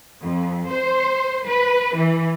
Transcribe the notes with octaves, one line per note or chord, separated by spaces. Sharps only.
F2
C5
B4
E3